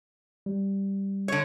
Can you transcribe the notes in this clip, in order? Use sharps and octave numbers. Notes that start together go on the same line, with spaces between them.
G3
D3 C#5